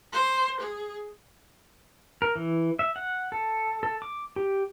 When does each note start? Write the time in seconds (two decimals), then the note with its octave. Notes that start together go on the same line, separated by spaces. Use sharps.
0.13 C5
0.60 G#4
2.22 A#4
2.36 E3
2.79 E5
2.96 F#5
3.32 A4
3.83 A4
4.02 D6
4.36 G4